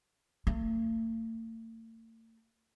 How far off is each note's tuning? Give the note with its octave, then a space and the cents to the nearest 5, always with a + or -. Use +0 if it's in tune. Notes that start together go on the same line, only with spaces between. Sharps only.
A3 +45